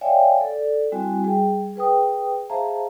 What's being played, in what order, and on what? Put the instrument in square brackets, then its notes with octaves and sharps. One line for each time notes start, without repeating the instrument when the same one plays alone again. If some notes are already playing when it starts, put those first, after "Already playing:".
[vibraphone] C#5 D5 E5 F5 G5 G#5
A4 D5
G3 C4 E4 F#4 G#5
G3 G#4 G5
G#4 B4 G5 D#6
G#4 C5 E5 F5 A5 A#5